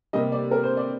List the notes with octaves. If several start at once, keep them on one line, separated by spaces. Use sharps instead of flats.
C3 G3 A#3 D#5
D5
A#4
C5
D5